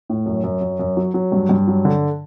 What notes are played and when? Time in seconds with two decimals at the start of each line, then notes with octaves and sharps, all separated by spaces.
0.10 A2
0.26 F#2
0.44 F#2
0.61 F#2
0.79 F#2
0.97 F#3
1.14 F#3
1.32 G2
1.49 G2
1.68 F#3
1.85 D3